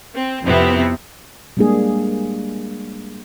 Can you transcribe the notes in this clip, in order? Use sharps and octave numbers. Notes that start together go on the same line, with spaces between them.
C4
F2 C3 B3 C4 E4
G3 G#3 A#3 D4 G#4